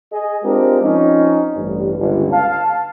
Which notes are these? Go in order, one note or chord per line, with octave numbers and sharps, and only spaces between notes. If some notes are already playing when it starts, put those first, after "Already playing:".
G#4 D#5
G#3 C4 D4 F4 G4 A#4
F3 C4 C#4 D#4
A1 G2
G1 C#2 G2
F5 A5